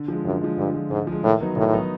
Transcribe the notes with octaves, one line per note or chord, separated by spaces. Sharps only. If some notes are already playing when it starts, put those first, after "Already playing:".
Already playing: D3
F3 G#3
F#2 D3
F3 G#3
G2 D3
F3 G#3
G#2 D3
F3 G#3
A2 D#3
F#3 B3 D#4
A2 D#3
F#3 B3 D#4